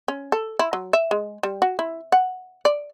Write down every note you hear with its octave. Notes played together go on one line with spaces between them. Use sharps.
C#4
A4
E4
F#3
E5
G#3
G3
F#4
E4
F#5
D5